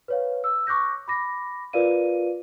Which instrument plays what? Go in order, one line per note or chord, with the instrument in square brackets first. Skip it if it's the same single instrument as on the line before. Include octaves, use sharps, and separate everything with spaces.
[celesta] B4 C#5 F5
E6
C#6 D6 F#6 G6 A#6
B5 D6 A#6
F4 A#4 B4 D5 F5 D#7